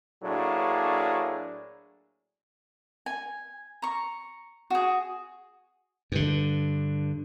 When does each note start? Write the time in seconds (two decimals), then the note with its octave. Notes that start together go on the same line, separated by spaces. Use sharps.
0.23 A2 F#3 A#3 D4 G#4
3.06 G#5
3.82 A#5 C#6
4.70 F#4 G#4
6.12 G2 D3